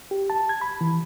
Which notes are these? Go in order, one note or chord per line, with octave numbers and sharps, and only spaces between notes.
G4
A5
G#6
B5
E3